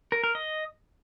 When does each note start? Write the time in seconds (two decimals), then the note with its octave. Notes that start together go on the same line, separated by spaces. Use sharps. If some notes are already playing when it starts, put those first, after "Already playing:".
0.12 A#4
0.24 A#4
0.35 D#5